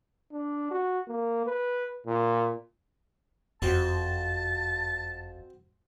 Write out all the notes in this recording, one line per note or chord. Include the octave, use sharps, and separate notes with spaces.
D4
F#4
A#3
B4
A#2
F#1 F2 C4 F#4 C5 A5